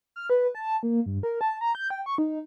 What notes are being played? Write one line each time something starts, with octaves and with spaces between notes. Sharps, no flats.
F6
B4
A5
A#3
G2
A#4
A5
A#5
G6
G5
C#6
D#4